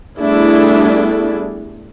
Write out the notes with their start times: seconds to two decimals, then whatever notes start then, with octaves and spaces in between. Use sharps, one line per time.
0.18 G3 A3 B3 D4 E4 G#4